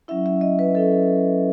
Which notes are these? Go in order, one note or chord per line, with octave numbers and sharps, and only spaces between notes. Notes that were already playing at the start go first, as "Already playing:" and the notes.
F#3 C#4 E4 E5
E5
D#5
B4
F#3 C#4 E4 A4